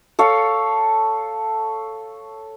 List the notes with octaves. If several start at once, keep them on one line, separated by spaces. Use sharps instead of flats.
A4 C#5 F5